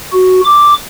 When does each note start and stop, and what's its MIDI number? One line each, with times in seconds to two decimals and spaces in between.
0.13 0.41 66
0.45 0.74 86